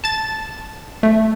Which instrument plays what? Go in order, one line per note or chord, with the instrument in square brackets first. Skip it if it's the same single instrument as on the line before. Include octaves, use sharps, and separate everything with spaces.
[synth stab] A5 A6
A3